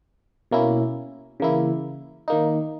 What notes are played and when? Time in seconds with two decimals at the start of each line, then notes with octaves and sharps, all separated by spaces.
0.51 B2 A#3 C#4 E4
1.40 C#3 E3 A#3 E4
2.28 D#3 A#3 D#4